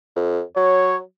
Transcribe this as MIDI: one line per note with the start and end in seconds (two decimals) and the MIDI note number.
0.16 0.41 41
0.57 1.00 54
0.57 0.97 73